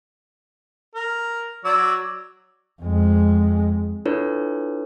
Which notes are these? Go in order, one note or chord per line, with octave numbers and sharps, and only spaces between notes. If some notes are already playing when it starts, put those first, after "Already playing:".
A#4
F#3 D5 E6
F2 G#3
D4 E4 F4 A4 B4 C#5